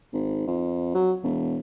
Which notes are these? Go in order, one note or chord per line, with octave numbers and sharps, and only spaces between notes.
G#1
F2
F#3
E1